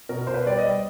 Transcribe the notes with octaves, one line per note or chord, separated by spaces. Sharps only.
B2 A#4
B2 C5
B4
G3 D5
D#5
G3